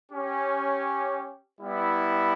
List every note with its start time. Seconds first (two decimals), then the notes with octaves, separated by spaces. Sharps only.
0.11 C#4 G4
1.61 G3 B3 E4